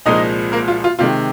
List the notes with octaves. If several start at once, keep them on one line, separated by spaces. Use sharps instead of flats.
C2 A#2 F3 G#3 D#4 D#5
A#3 A#4
F4
F4
C3 D#3 G#3 F4